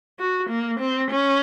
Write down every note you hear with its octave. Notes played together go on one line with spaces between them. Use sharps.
F#4
A#3
C4
C#4